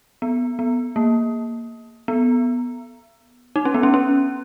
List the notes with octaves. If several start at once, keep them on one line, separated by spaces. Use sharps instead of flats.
B3
B3
A#3
B3
D#4
C#4
B3
C#4
C#4